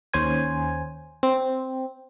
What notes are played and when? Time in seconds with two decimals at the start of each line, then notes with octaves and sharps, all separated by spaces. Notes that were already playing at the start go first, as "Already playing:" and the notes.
0.14 D#2 C#4 C5 G#5
1.23 C4